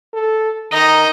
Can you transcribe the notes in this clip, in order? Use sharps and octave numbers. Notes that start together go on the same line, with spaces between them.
A4
D#3 D#4 D#5 A#5